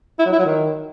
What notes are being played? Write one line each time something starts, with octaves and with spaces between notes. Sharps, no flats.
E4
F#3
E4
F#3
D#3